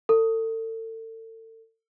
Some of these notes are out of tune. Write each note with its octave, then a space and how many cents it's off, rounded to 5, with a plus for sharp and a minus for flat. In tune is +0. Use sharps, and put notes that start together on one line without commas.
A4 +35